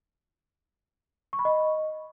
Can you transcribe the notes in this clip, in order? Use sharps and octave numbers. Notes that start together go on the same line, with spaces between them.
C#6
B5
D#5